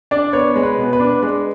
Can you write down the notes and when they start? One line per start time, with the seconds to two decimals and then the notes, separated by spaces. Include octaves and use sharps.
0.11 D4 D5
0.33 B3 C#5
0.56 G#3
0.63 B4
0.78 B2
0.93 B4
1.00 D4
1.22 G#3 B4